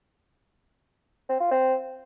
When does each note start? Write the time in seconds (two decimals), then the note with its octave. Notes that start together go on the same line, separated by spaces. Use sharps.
1.30 C4
1.41 F4
1.51 C4